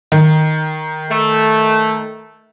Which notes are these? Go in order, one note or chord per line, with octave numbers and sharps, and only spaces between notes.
D#3
A3